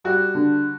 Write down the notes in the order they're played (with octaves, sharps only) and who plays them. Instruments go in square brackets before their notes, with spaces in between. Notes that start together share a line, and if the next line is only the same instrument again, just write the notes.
[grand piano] G3 F#4
D3